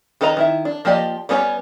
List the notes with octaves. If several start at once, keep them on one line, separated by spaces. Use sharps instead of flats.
D#3 A4 B4 D#5 A#5
D#3 E4 E5
D4
F3 A#3 G4 D5 D#5
G3 B3 C#4 A4 C#5